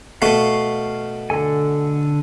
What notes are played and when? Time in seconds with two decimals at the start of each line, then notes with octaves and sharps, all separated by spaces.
0.22 B2 A3 F5 C#6
1.30 D3 A4 G#5